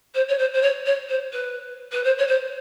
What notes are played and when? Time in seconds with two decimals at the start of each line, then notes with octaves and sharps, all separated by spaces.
0.14 C5
0.28 C#5
0.38 C5
0.53 C5
0.61 C#5
0.85 C#5
1.08 C5
1.32 B4
1.91 B4
2.03 C5
2.18 C#5
2.27 C5